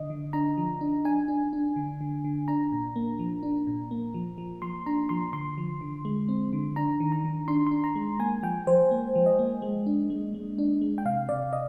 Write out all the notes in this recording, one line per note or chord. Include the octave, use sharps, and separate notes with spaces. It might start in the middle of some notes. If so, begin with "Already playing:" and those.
Already playing: D3 D#5
D3
D4 A#5
F3
D4
D4 G#5
D4
D4
D3
D3
D3
D4 A#5
A#2
A#3
F3
D4
A#2
A#3
F3
F3
F3 C6
D4 A#5
F3 C6
D3 C6
F3
D3
G#3
C4
D3
D4 A#5
D#3
A#5
D#3
D4 C6
D4 C6
A#5
G#3
A#3 G#5
F3 G5
F3 C5
A#3
F3
D#5
A#3
G#3
D4
G#3
G#3
D4
G#3
G5
C3 F5
C3 D5
D#5